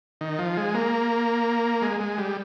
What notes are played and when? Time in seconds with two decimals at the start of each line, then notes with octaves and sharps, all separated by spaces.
0.21 D#3
0.39 F3
0.57 G#3
0.74 A#3
1.82 G#3
2.00 G#3
2.18 G3